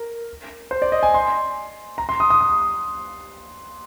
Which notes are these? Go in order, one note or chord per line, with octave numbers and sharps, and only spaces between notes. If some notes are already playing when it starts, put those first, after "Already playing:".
Already playing: A#4
C5
D5
D#5
G#5
C6
A#5
C6
D#6
D#6
D#6